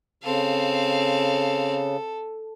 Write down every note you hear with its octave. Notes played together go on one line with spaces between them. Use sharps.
C#3 C4 A4 F5